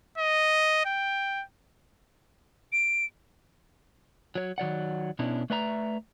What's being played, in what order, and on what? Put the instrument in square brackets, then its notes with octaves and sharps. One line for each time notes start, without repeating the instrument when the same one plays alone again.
[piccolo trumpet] D#5
G5
[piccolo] D7
[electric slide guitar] F#3 C#5
D#3 F#3 D5 F#5
B2 B3 C#4 D4 E4
A3 B4 D5 E5 A#5